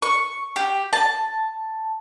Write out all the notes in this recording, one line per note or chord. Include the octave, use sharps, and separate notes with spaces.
C#6
G4
A5